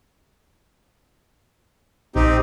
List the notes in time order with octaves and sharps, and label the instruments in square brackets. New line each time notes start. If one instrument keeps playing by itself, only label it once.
[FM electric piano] A#1 [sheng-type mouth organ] C4 D#4 G4